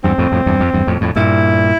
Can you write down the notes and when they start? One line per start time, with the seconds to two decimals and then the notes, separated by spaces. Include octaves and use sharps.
0.04 E2 G2 C4
0.18 F2 A2
0.32 F2 A2
0.46 E2 G2
0.60 F2
0.74 E2 G2
0.87 F2 A2
1.01 F2 A2
1.16 G2 A#2 E4